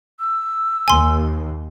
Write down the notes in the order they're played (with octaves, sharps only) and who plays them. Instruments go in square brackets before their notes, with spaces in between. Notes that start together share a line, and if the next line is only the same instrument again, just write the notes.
[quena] E6
[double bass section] D#2 [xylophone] G#5 C6